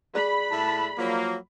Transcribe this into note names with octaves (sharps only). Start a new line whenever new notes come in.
G#4 D5 B5 F#6
A2 E5 A5
F3 F#3 A#3